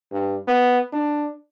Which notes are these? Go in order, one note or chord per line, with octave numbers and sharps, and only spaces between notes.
G2
B3
D4